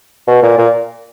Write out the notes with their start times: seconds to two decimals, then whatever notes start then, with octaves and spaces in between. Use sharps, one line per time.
0.27 B2
0.43 A#2
0.58 A#2